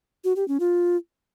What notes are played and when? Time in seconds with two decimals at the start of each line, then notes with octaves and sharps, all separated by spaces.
0.24 F#4
0.36 G4
0.48 C#4
0.60 F4